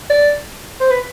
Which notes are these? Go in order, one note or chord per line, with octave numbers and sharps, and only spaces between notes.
D5
C5
B4